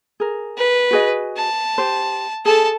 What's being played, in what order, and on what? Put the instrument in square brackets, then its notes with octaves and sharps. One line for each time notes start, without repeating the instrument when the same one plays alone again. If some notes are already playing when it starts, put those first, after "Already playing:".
[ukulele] G#4 A#4
[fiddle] B4
[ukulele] F#4 G#4 D#5
[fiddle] A5
[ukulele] G4 C5
[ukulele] G#4 [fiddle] A4 A5